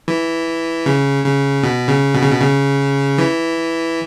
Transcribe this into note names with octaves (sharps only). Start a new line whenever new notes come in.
E3
C#3
C#3
B2
C#3
B2
C#3
B2
C#3
E3